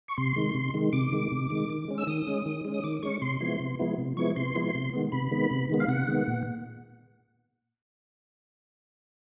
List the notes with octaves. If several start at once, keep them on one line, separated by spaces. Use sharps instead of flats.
C#6
C3 C6
D#3 G#3
C3
D#3 G#3
C3 D6
D#3 G#3
C3
D#3 G#3
D#3
G#3 C#4
E6
D#3 D#6
G#3 C#4
D#3
G#3 C#4
D#6
D#3 D6
G#3 C#4 C#6
C3 C6
F3 G#3 B3 E4
C3
F3 G#3 B3 E4
C3
F3 G#3 B3 E4 C#6
C3 C6
F3 G#3 B3 E4
C3
D#3 G#3 B3
C3 B5
D#3 G#3 B3
C3
D#3 G#3 B3
F5
C3 F#5
D#3 G#3 B3
A#2